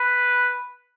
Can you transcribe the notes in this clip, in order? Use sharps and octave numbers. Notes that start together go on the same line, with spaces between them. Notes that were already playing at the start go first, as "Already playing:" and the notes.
Already playing: B4